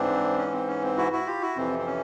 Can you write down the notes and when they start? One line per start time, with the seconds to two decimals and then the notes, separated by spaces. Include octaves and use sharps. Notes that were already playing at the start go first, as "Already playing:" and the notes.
Already playing: G#2 E3 C4 D4
0.38 C#4
0.53 C4
0.67 C#4
0.83 C4
0.97 E4 F#4
1.12 E4 F#4
1.27 F4 G4
1.42 E4 F#4
1.56 F2 C3 E3 C4
1.79 C4
1.86 C#4